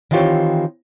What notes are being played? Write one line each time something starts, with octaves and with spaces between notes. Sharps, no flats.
D#3 E3 C4 F4 G4 C#5